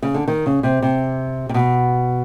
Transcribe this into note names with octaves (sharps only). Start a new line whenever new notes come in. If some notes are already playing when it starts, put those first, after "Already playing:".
C#3
D3
D#3
C#3
C3
C3
C3
B2